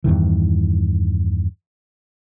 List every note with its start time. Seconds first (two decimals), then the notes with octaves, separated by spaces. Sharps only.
0.04 E2 G2 D#3 E3